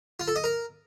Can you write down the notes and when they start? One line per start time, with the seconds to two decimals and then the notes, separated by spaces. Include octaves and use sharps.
0.20 F4
0.28 A4
0.36 D#5
0.44 A#4